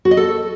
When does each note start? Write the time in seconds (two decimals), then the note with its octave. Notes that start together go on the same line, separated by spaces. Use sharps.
0.05 F#4
0.11 D#5
0.17 A4